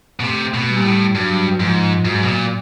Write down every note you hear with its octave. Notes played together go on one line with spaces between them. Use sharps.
B2
C3 A3
B2
G3
A#2
A2
G2 F#3
G#2 F3
G#2 F#3
B2
A#2